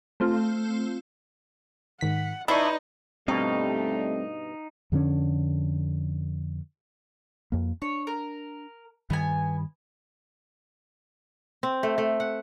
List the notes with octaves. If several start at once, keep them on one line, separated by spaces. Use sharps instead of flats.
A3 C4 F4
G#2 D#3 F#5 B6
D#4 E4 B4 D5 A5 C6 C#6
G2 B2 G3 A3 C4 D#4 D#5 F5
F2 D3 B3 C#4
F2 A#3
D4 C#5
A#4
G2 D#3 B3 G#5
C4
A3
A3
F#5